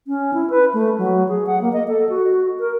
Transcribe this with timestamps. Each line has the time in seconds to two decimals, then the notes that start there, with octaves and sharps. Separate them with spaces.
0.08 C#4
0.34 E4
0.50 B4
0.74 A3
0.98 F#3
1.29 G#4
1.47 F#5
1.62 A#3
1.73 D#5
1.88 A4
2.09 F#4
2.60 A#4